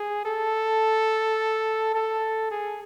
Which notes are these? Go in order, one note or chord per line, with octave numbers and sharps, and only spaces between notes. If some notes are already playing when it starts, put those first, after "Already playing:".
Already playing: G#4
A4
A4
G#4